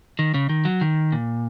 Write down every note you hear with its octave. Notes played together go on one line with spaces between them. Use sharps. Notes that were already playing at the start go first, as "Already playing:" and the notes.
D#3
C#3
D#3
F#3
D#3
A#2